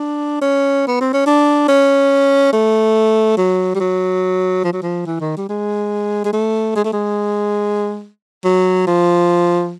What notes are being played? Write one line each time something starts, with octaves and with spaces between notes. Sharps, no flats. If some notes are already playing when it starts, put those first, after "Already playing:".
Already playing: D4
C#4
B3
C4
C#4
D4
C#4
A3
F#3
G3
F#3
F3
F#3
F3
E3
D#3
G3
G#3
G#3
A3
G#3
A3
G#3
F#3
F3